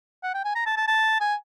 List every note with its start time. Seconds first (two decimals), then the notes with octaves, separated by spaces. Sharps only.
0.23 F#5
0.34 G5
0.45 G#5
0.55 A#5
0.66 A5
0.77 A5
0.88 A5
1.20 G#5